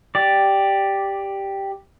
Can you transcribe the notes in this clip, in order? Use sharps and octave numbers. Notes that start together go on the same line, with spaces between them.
G4 D5